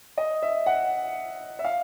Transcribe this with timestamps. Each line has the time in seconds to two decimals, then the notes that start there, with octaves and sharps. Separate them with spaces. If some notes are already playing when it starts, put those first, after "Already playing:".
0.18 D#5
0.42 E5
0.66 F#5
1.59 E5
1.64 F5